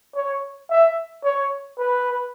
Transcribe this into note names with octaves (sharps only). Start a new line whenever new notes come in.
C#5
E5
C#5
B4